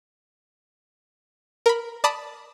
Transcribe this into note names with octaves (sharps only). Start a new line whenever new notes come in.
A#4 B5
D5 A5 B5 D#6 B6